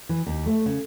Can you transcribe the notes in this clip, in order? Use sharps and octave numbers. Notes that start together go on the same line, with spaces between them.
E3
D#2
A3
C#3